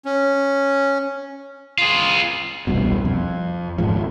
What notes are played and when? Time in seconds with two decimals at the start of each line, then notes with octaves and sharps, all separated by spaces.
0.05 C#4
1.78 F4 G#4
2.67 E1 C2 G2 B2
3.05 F2
3.78 D#1 G#2 F3